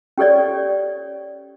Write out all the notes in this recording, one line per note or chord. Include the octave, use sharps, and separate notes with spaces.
C#4 G4 A4 C#5 D5